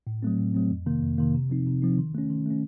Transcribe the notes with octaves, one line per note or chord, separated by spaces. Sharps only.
A2
F#3 A3 C4
A2
F#3 A3 C4
F2
C3 D#3 A#3
F2
C3 D#3 A#3
C3
F3 C4 D#4
C3
F3 C4 D#4
D#3
A3 C#4
D#3
A3 C#4